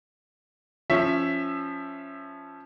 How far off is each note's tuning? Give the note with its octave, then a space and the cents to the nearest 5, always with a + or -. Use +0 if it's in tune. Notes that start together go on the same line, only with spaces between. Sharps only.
F3 +0 C#4 +0 E5 +5